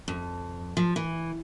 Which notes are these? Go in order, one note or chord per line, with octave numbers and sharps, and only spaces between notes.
F2
F3
E3